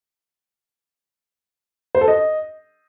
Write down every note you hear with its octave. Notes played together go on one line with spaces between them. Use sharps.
C5
A4
D#5